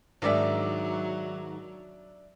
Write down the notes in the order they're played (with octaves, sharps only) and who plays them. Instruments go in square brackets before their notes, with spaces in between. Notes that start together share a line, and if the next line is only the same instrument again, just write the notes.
[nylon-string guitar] G#2 D#3 [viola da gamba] F#3 [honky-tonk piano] D4 D5 E5